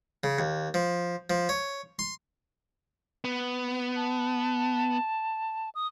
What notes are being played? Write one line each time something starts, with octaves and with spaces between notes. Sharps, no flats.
C#3
D#2
F3
F3
C#5
C6
B3
A5
D#6